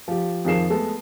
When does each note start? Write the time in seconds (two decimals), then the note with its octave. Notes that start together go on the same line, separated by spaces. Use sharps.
0.08 F3 G4
0.45 F2 D#3 F3 G#4 C7 E7
0.70 G#3 A3 B3 A4